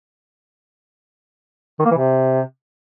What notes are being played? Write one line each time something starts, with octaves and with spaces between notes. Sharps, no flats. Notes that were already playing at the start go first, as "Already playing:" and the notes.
D#3
A#3
E3
C3